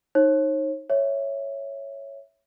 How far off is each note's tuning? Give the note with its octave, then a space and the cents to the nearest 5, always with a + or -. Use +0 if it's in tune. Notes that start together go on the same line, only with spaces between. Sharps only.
D#4 +0 C#5 -40
C#5 +0 E5 +0